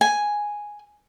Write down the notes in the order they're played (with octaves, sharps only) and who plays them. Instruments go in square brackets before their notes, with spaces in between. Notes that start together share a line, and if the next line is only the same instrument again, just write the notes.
[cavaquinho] G#5